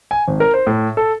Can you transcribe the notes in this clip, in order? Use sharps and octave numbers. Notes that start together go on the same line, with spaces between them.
G#5
G#1
A#4
C5
A2
A4